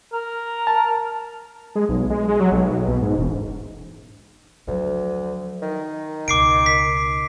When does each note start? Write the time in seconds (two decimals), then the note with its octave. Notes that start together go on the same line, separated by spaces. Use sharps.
0.13 A#4
0.67 A5
1.75 G#3
1.89 B1
2.10 G#3
2.28 G#3
2.40 F#3
2.52 B1
2.71 B1
2.88 B2
3.02 G#2
3.18 E1
4.67 D2 F3 F#3
5.62 D#3
6.28 C#2 B2 D6 C7 D7
6.66 B6